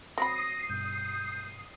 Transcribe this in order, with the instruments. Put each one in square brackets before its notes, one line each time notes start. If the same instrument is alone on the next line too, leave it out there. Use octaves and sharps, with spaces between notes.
[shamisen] F#3 C4 B5 [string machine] D#6 C7 [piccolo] A#6
[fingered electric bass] G2 B2 [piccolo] G6